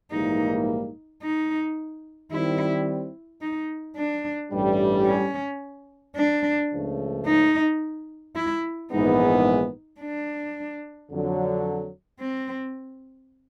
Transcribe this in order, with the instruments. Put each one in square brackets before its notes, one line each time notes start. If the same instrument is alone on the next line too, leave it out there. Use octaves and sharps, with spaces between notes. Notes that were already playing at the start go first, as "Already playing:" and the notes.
[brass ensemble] A#1 G#2 E3 G3 A#3 [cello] D#4
[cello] D#4
[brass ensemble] D#3 G3 C4 [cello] E4
[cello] D#4
D4
[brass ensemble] A1 G2 E3 G3
[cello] C#4
D4
[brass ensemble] C#2 C#3 F3 A3
[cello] D#4
E4
[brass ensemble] A#1 G#2 E3 G#3 B3 [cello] D#4
[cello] D4
[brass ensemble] F2 D3 F#3
[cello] C4